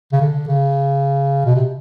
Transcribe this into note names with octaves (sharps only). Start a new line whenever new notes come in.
C#3
D3
C#3
B2
C3